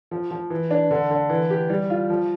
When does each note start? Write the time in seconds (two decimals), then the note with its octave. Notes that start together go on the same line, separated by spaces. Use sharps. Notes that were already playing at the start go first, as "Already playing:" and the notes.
0.11 F3
0.31 F3
0.50 E3
0.71 D4
0.91 D3
1.11 D3
1.29 E3
1.50 G4
1.70 G3
1.90 F4
2.10 F3